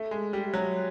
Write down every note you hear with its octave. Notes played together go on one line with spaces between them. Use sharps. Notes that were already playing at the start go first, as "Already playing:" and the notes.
Already playing: A3
G#3
G3
F#3